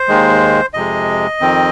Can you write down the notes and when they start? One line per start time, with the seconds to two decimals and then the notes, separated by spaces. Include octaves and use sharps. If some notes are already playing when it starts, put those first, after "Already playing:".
Already playing: C5
0.08 D#2 D#3 G#3
0.74 F2 C3 G#3 D#5
1.40 F2 D#3 C4